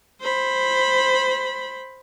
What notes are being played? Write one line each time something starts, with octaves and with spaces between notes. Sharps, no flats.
C5 B5